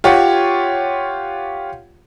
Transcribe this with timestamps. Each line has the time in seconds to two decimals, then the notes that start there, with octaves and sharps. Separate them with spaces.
0.04 F4 G4 C#5 F#5